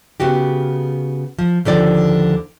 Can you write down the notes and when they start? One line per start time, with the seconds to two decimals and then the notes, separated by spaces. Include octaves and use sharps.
0.20 C#3 B3 F#4 G4
1.39 F3
1.65 D#2 D3 F3 D5